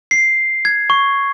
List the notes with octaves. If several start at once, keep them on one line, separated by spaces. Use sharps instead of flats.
C7
G#6
C#6